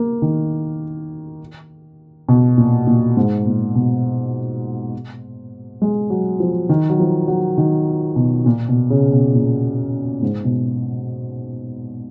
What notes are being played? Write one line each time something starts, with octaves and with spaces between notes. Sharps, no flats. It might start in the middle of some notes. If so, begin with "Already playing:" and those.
Already playing: A#3
D#3
B2
A#2
A#2
G#2
A#2
B2
G#3
F#3
F3
D#3
F#3
F3
F#3
D#3
B2
A#2
B2
C#3
B2
A#2
G#2
B2